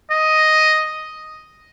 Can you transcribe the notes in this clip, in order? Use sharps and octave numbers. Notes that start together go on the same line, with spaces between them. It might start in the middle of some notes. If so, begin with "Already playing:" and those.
D#5